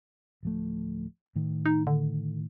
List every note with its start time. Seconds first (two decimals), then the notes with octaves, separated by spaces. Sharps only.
0.43 D1 F3 A3
1.36 A2 D#3
1.66 D#4
1.87 D3